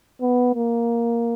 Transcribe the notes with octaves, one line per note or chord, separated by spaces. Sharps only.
B3
A#3